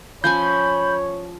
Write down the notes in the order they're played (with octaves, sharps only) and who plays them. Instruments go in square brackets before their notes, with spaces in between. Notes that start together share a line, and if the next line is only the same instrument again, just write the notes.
[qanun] F3 C#4 G#5 [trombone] C#5 [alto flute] B5 [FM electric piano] G6